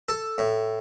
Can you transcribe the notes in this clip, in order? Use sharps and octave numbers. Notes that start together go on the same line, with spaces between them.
A4
A2